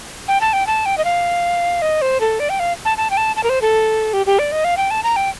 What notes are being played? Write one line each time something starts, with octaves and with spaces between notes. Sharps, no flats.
G5
A5
G5
A5
G5
D#5
F5
D#5
C5
A4
D5
G5
F5
A5
A5
G5
A5
A5
A#4
C5
A4
G4
G4
D5
D#5
F5
G5
A5
A#5
G5